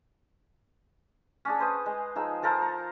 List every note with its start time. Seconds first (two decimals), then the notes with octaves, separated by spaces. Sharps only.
1.45 C#4 D4 G#4
1.59 B4 C5 D#6
1.86 G#3
2.15 F3 D#4 G#4 E6
2.43 F3 A4 A#4 C5
2.62 A#5